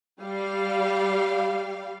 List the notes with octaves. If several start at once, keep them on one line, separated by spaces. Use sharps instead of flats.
G3 F5